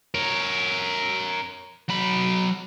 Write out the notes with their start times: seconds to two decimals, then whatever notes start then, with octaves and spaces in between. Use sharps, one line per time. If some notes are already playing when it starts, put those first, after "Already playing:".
0.14 A#4 C#5
1.89 F#3 B5